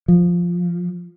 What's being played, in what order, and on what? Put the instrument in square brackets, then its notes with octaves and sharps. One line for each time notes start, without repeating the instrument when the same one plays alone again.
[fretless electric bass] F3